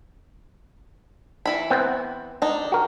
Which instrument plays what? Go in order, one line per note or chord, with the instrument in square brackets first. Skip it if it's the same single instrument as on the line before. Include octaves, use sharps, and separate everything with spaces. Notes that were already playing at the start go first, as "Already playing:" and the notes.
[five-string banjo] E3 E4 B5
[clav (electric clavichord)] B3 C4
[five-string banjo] D4 D#4
[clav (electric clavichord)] F#4 A#4